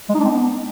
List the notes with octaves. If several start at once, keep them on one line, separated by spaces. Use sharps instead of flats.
G#3
D#4
D4
C4
B3